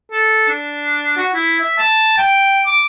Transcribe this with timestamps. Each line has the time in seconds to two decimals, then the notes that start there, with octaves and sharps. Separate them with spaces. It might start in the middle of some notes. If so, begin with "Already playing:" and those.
0.12 A4
0.49 D4
1.17 F#4
1.34 E4
1.60 E5
1.78 A5
2.18 G5
2.66 D6